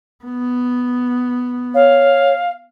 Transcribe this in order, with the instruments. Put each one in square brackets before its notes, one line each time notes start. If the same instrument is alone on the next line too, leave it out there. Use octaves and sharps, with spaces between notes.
[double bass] B3
[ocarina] C#5 [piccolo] F5